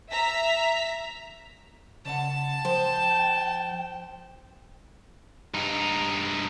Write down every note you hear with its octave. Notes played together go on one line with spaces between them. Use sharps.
E5 A#5 B6
C#3 D5 F#5 A5
F3 C5 G5
G2 D#4